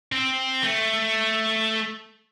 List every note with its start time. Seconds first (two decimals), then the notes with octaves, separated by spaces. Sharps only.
0.12 C4
0.63 A3